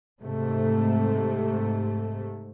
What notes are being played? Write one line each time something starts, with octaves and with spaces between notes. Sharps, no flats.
G#2 C3 A3